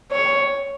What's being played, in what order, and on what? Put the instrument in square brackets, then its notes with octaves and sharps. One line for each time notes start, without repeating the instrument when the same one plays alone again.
[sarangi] C#5